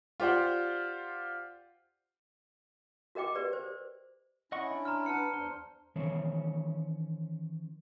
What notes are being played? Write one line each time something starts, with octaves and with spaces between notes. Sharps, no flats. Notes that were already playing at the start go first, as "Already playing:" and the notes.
F4 G4 C5 D5 F#5
F#4 A#4 D#5 G5 D6
G4 B4 D5
C5
C#4 E4 D#5 F#5 C#6
D4
A#5 C6 F6
B4 F#5 A5 F6 C#7
E2 D4 C5
D#3 E3 C#4 C5 C#5